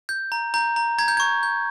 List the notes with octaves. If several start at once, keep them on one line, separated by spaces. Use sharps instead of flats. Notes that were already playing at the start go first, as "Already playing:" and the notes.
G6
A#5
A#5 G6
A#5
A#5 G#6
G6
C#6 G#6
G6